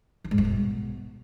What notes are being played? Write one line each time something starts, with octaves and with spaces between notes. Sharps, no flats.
E3
G#2
G2
B2